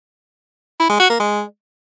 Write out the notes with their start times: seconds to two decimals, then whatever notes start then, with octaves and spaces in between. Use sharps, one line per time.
0.80 E4
0.90 G#3
1.00 F#4
1.10 A#3
1.20 G#3